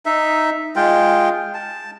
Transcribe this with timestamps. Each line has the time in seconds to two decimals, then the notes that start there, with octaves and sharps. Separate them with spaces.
0.06 D#4 E5
0.76 G#3 F4 G5
1.54 A5